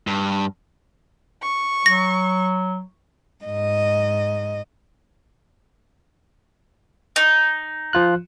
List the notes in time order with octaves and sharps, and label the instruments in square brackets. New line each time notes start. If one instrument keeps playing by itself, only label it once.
[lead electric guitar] G2
[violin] C#6
[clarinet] F#3 [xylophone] A#6
[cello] G#2 D#5
[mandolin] D#4
[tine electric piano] F3 F4 F#6